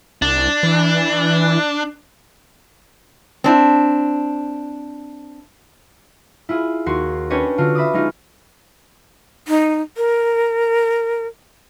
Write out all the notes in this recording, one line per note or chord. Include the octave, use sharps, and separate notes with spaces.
C2 D4
E3
C4 D4 E4
E4 F4 G#4
D#2 F#4 C6 C7
C#4 D4 G4 B4 C#5 D#5
D3 F4 F#4
E5 B5 D6 D#6
G#3 C#4 D#4 F4
D#4
A#4